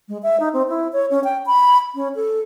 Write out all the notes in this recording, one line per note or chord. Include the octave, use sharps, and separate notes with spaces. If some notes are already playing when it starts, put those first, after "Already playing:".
G#3
E5
D#4
C4
E4
C#5
C#4
G5
B5
C#4
A4